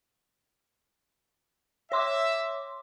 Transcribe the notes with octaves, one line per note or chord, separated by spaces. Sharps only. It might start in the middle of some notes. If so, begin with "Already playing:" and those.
C#5 E5 C6 D6